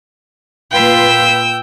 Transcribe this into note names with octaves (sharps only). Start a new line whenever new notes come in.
A#2 F4 B4 G5 E6